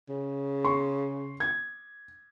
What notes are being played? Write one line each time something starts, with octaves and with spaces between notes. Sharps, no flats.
C#3
C6 C#6
G#6